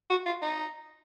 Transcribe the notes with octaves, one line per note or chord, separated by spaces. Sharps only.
F#4
F4
D#4